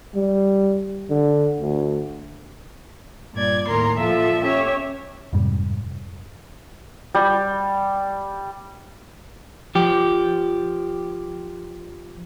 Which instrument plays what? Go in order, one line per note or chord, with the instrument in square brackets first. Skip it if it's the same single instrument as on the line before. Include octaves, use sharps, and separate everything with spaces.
[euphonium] G3
D3
D2
[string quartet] G2 A#2 D5 G#6
D#2 A2 A#4 A#5 C6
A#2 F3 F4 A4 E5
C#4 G4 C#5 E5
[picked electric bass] F2 G#2 C3 G3
[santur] G3
[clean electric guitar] F3 G4